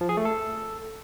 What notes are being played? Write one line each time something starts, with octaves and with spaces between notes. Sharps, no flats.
F3
G#4
A3
A4